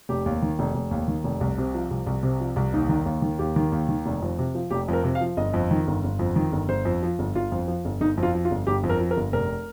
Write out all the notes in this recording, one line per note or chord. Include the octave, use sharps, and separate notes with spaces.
F1 G4
D#2
D#3
F1
F1
D#2
D#3
F1
C2
C3
F3
C2
C2
C3
F3
C2
D#2 D#4
D#3
D#2
D#3
D#2 G4
D#3
D#2
D#3
F1
F2
C3
F3
F1 G4
F2
A#4
C3
F5
F3
G1 D#5
F2
D#3
G1
G1
F2
D#3
G1
G1 C5
F2
F3
G1
G1 F4
F2
F3
G1
G1 D#4
F2
F4
F3
F4
G1
G1 G4
F2
A#4
F3
A#4
G1
F1 A#4